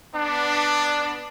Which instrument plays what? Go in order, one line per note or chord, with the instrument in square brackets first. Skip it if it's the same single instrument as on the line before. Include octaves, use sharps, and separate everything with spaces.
[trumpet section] B3 D4